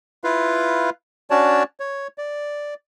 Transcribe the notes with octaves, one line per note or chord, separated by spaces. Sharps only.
E4 F4 B4 F5
C#4 D4 F#4 C#5 D5 A5
C#5
D5